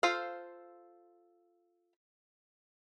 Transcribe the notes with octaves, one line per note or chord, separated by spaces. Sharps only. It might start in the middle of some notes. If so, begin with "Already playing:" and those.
F4 A4 C5 F5